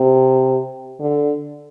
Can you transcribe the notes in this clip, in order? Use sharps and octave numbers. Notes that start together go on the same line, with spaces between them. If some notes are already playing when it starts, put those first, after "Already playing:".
Already playing: C3
D3